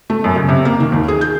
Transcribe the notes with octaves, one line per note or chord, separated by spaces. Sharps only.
A3
F#2
C#3
C3
A#3
D#3
D#2
G#4
G6